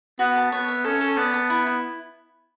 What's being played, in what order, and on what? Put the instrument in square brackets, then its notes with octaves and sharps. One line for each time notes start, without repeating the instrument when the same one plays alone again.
[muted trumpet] B3 [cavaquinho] F#4
[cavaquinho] A5
[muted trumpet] B3 [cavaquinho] C#5
[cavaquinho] E5
[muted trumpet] C#4 [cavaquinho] A4
[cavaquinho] A4
[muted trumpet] B3 [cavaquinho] D5
[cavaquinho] A5
E4
E4